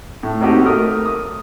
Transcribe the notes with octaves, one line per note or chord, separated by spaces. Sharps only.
A2
A#3 C4 D#4 F#4 G4 A4
A3 A#4 D#6
D#6